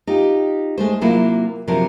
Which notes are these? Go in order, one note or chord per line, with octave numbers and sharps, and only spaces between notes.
D#4 F4 G4
G#3 A3 C5
C3 F#3 A#3 E4 F4
C3 F3 F#3 D4 A#4